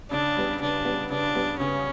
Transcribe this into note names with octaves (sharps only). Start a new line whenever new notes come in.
C#3 D4
G3 B3
C#3 D4
G3 B3
C#3 D4
G3 B3
C#3 C#4